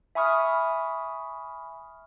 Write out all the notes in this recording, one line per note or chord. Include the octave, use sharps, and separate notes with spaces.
E5 G#5 B5 C#6 D#6 F6